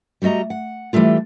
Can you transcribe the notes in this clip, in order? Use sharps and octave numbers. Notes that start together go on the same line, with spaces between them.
G3 A3 F#4 D#5 A#5
F#5
E3 F3 G3 A3 F4